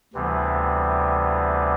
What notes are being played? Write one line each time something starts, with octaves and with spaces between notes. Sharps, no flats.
D2 C3 E3 G3 B3